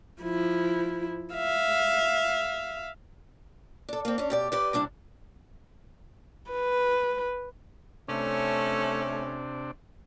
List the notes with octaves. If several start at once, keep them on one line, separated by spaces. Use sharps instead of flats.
F3 E4
E5 F5
D4 A4
A#3 C4
C#4 D4
B2 G4 D5
G4 B4 D5
C3 G3 D4 E4
B4
C3 A3 C#4 D4